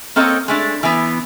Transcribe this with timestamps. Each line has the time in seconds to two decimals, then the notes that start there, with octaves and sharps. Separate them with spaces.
0.16 A#3 C4 A4 C#5 D#5
0.48 G#3 A3 D4
0.83 E3 B3